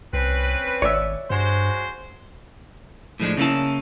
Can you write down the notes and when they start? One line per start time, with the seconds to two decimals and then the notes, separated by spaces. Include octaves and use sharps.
0.13 C2 C4 C#4 B4
0.82 G#1 C#5 D5 E5
1.30 G2 G#3 F#4 C5
3.20 A2 F3 G#3 D4
3.37 C#3 A#3 C#4 E4 A5